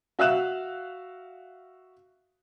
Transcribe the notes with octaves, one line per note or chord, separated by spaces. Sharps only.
F#4 E5 F5 F#6 E7